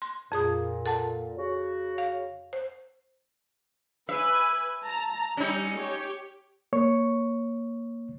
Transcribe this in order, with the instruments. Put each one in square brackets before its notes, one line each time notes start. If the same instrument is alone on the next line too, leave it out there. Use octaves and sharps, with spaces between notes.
[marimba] C6
[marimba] F2 G#4 D#6 [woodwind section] A#2
[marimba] A4 F#5 A5
[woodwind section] C#3 F#4
[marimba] F5
C5
[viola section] B4 G#5 [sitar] E5
[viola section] A5 A#5
[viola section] G3 [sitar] C#4 D#4
[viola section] G4 C#5
[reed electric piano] A#3 C#5 C#6